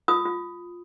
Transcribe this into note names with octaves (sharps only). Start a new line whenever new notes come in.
F4 D#6
F4